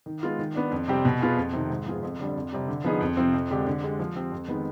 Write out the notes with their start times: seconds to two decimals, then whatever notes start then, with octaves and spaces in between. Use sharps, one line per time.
0.06 D#3
0.23 G#3 B3 F4
0.39 D#3
0.55 B3 D4
0.71 F2
0.88 C3 G3 C4 G4
1.05 B2
1.21 B3 F4 G#4
1.37 F2
1.53 C3 D#3
1.70 G#2
1.86 F3 B3 F4 G#4
2.03 F2
2.20 D3 G3 D4
2.36 F2
2.53 C3 G3
2.68 D3
2.84 F3 B3 D#4 G#4
3.01 F2
3.17 C3 F3 C4
3.34 F2
3.50 D3 G#3 D4 G4
3.67 D3
3.84 G#3 D4 G4
4.00 F3
4.16 C4 G4
4.32 F2
4.48 D#3 G#3 B3